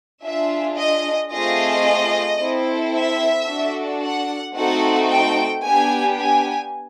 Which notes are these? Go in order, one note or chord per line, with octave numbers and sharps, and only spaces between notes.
D4 F4 G#4 E5
D#5
A3 C4 F4 G#4 D#5
C4 E4 A4
E5
D4 F#4 A4
F#5
A3 C4 D#4 F#4 A4 F#5
G5
B3 D4 G4 G#5
G#5